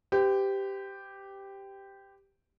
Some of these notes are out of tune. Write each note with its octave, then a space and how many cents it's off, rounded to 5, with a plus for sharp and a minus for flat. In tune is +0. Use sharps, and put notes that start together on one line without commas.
G4 +0 C5 -45